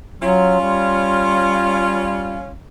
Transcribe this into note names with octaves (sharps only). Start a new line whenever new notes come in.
F#3 C#4 F4 C6
G3